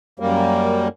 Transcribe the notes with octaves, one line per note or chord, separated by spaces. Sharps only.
F#2 G3 A#3